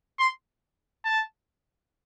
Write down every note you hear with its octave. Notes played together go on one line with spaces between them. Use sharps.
C6
A5